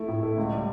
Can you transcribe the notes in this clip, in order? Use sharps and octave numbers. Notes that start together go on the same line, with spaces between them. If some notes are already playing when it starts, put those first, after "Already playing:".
Already playing: A3 E4
A2
A3
C#2
G3